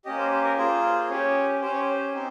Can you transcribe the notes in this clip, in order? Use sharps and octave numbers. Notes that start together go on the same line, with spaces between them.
A#3 C#4 G4 D#5
C5
C5
A#4
A#3 F4 G#4 C5
C#4 G4 C#5
C#4 G4 C5
C#5
C5
C4 D#4 G4